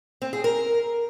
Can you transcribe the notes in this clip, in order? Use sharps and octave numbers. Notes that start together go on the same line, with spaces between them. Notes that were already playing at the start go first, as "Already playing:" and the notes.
C4
G#4
A#4